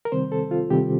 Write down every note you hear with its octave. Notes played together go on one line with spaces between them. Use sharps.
A#4
C3 D#3 G3 C4 C5
A4
F4
C3 D#3 G3 C4 G4